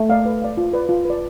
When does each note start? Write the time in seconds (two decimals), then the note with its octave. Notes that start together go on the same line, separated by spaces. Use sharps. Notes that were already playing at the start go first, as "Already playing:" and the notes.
Already playing: A3
0.10 D5 F5
0.26 B4
0.42 D5 F5
0.57 F4
0.73 B4 D5
0.89 F4
1.05 B4 D5